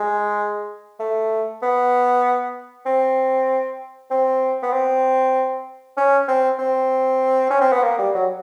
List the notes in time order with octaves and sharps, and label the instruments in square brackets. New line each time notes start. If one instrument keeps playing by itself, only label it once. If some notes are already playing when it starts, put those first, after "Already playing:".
Already playing: [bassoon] G#3
A3
B3
C4
C4
B3
C4
C#4
C4
C4
C#4
C4
B3
A#3
G3
F#3